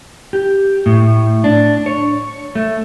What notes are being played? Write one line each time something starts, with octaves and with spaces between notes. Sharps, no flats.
G4
A2
D4
C#5
A3